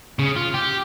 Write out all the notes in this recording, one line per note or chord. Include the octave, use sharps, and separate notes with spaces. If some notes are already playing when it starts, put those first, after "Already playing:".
C#3
F4
G4